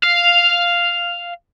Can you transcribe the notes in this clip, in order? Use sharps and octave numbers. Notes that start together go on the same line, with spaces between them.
F5